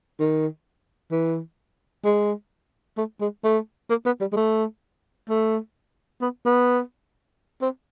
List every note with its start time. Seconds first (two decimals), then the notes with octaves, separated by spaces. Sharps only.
0.19 D#3
1.11 E3
2.04 G#3
2.98 A3
3.21 G#3
3.44 A3
3.90 A#3
4.06 B3
4.21 G3
4.32 G#3
4.37 A3
5.29 A3
6.22 B3
6.45 B3
7.62 C4